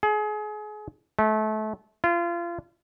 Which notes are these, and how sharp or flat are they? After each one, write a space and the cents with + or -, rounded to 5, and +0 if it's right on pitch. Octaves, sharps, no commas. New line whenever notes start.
G#4 +30
A3 -30
F4 -30